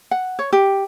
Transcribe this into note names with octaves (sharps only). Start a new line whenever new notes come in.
F#5
C#5
G4